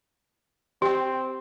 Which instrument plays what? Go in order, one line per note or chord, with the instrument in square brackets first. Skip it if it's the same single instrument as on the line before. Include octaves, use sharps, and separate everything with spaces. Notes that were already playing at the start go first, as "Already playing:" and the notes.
[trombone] C4 [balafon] G4 G5 [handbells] C6